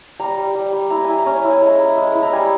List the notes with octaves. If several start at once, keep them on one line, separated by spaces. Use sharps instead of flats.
G3 A#5
G3
G3
G3
E4 A#5
E4 G#5
A#5
C#4
E4
G#5
G#3 A#5
E4
G#3
E4
A#5
G3 G#5